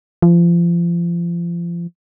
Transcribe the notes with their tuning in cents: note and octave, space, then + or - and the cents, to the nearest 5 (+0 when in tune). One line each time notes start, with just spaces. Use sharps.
F3 -30